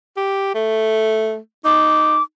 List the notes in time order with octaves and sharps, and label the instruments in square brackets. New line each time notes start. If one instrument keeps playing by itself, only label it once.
[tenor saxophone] G4
A3
[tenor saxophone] D#4 [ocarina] D6